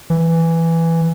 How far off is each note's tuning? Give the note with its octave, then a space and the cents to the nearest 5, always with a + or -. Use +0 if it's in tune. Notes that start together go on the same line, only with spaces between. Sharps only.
E3 +5